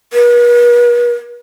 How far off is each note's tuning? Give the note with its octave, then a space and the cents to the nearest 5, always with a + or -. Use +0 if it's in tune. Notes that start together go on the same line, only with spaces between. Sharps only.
B4 -45